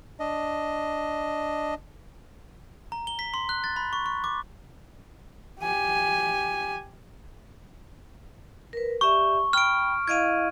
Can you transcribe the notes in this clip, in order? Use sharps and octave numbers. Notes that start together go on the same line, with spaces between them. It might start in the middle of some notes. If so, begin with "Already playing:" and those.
D4 D#5
A#5
G7
B6
C6
F#6
A6
B5
C#6
C#6
D6
G4 G#5
A#4 B4
G4 D5 E5 C#6
G5 B5 F6 D7
E4 D#5 F5 G#6 D7 D#7